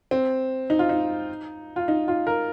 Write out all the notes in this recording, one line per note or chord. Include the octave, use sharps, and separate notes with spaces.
C4
D#4
F4
D#4
F4
D#4
F4
A#4